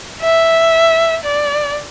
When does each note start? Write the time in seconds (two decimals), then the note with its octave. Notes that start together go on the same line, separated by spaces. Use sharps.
0.22 E5
1.25 D5